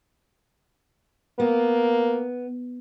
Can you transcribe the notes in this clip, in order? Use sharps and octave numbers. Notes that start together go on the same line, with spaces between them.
A#3 B3